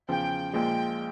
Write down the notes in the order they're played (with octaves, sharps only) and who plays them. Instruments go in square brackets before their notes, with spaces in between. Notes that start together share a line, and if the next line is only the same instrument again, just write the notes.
[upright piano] E2 C#3 F3 [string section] G5
[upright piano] A#1 A#2 F3 G#3 [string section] G5